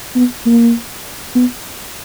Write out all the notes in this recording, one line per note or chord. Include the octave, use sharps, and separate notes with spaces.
B3
A#3
B3